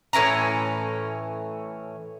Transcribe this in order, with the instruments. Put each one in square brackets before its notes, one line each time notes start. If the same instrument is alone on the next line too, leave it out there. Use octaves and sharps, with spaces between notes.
[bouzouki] A2 E3 C#4 A#5